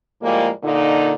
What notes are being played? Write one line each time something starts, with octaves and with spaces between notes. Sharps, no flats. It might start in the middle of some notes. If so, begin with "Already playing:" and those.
A2 F3 G3 G#3 A#3
A#2 D3 D#4